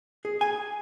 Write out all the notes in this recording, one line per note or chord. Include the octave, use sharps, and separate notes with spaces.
G#4
G#5